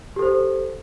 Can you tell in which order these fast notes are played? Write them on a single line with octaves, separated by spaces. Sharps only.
G4 A4 C5